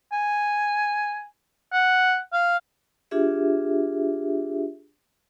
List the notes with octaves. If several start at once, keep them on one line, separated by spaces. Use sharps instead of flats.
G#5
F#5
F5
D4 F4 G4 G#4 E5